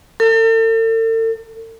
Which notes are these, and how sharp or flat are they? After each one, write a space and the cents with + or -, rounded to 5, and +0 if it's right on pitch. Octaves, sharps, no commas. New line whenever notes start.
A4 +40